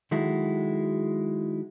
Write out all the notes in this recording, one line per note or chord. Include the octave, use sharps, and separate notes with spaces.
D#3 F#3 G#3 E4 F#4 A4